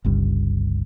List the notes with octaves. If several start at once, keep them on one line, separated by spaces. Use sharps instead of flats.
G1 C#2 G2